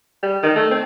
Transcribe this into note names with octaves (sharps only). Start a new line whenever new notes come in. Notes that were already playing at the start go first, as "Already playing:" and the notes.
G3
D#3
A3
C4